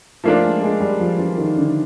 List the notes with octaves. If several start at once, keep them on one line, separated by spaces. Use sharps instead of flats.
F3 A3 A#3 D4 F4
G#3
G#3
G3
F3
E3
D#3
D3